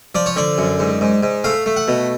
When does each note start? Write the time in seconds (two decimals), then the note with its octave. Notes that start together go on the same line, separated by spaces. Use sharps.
0.15 F3 D5
0.26 C#5
0.36 D3 D5
0.58 F#2
0.79 G#2
1.01 G#2
1.23 G#2
1.44 A3 F5
1.66 A3
1.77 F#5
1.88 B2